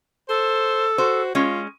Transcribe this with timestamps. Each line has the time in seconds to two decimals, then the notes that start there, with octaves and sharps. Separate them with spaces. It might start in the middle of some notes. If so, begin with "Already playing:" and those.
0.29 A4 C5
0.98 F#4 C5
1.35 G#3 C#4 F4